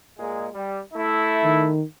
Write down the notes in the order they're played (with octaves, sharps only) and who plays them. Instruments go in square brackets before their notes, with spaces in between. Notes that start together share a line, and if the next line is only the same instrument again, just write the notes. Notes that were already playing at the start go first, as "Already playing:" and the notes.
[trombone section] A#2 G#3
G3
A3 E4
[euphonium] D#3